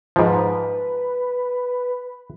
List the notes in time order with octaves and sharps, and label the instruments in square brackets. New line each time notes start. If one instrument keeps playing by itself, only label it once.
[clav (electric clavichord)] G#2 F3 [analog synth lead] B4